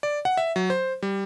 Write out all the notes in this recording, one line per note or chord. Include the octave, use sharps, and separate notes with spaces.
D5
F#5
E5
F#3
C5
G3